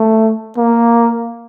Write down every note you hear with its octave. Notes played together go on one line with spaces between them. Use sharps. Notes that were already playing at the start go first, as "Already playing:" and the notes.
Already playing: A3
A#3